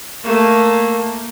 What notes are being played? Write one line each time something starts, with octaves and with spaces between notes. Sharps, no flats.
A3 A#3